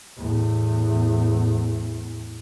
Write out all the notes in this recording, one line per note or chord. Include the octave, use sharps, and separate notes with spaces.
E2 A2